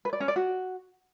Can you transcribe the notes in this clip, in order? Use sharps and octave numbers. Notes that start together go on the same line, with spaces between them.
B4
D5
C#4
D5
F#4